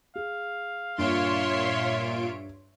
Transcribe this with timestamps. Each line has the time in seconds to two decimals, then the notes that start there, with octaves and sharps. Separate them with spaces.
0.15 G#4 F5
0.98 G2 A#2 F4 C#5 E5 C6 D7